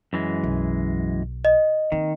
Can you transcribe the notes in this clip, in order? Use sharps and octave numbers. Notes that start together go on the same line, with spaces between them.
F#2 E3 G#3
B1
D#5
D#3 A#3 C4